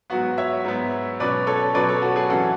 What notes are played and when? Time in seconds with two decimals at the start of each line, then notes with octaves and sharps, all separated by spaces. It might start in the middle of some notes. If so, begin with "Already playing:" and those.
0.10 G#2 F#3 B3 F#4
0.38 C#5 E5
0.64 G#2 F#3 B3
1.20 B2 F#3 C#4 B4 D5
1.47 A4 C#5
1.74 B2 F#3 C#4 B4 D5
1.88 A4 C#5
2.02 F#4 A4
2.16 G#4 B4
2.29 F#2 C#3 E3 F#4 A4